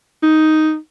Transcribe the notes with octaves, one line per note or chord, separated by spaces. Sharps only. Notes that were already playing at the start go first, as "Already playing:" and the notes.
D#4